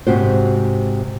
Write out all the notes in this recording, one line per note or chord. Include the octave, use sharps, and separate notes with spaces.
G#2 C3 F#4 C5